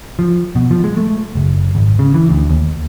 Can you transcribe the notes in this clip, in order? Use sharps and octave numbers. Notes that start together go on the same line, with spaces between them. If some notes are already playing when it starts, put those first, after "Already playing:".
F3
B2
F3
G#3
A3
F#1
G#1
C#3
E3
D2
D#2